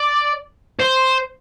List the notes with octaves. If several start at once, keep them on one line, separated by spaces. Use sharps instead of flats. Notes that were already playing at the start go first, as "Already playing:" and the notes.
Already playing: D5
C5